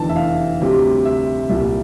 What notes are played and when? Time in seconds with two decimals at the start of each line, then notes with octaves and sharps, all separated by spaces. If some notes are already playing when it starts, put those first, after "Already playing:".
Already playing: F1 E2 D3 A5
0.09 E5
0.16 F5
0.60 D2 C3 G3
1.05 E5
1.49 C2 A#2 G3 E5